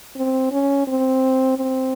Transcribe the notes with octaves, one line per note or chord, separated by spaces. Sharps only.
C4
C#4
C4
C4